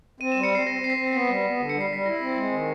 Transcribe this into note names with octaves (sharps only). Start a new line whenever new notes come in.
C4 D#7
E7
G3
C#7
C4 C7
C4 A#6
C4 C7
B6
C4
B6
B3 C7
G3
B3
D3
G3 C#7
C7
G3 B6
E4 A#6
C4
G#3
D#3